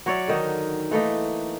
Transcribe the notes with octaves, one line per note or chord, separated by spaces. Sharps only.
F#3 C#5 D5 E5
D3 D#3 D#4
E3 A3 A#3 D#4